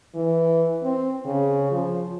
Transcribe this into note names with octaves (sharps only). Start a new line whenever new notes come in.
E3
C4
C#3
F3